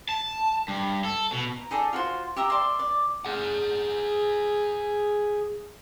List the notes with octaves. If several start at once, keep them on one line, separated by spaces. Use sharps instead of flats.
A5
G2
A4
B2
A#5
D#4 G#4 A4 D5
F4 F#4 C5
G4 E5 A#5
D5 E5 C6
D5
G#4 F#5